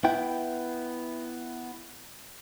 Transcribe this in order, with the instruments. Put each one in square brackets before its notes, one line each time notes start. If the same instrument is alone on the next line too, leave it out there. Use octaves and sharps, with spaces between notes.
[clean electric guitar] B3 E4 G5